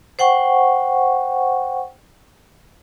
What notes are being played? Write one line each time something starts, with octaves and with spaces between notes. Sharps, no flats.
C5 F#5 G5 C#6